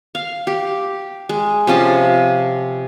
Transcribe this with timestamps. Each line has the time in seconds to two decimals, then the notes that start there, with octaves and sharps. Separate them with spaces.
0.15 F5
0.47 G4
1.29 G#3
1.67 C3 F3 C#4 A5